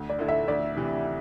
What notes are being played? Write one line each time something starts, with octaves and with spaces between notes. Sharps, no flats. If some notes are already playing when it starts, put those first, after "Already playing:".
Already playing: D2
D5
D3 A3 E4 A4
E5
D2 D5
C3 E3